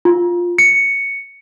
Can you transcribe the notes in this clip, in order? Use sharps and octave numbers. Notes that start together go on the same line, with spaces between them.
F4
C#7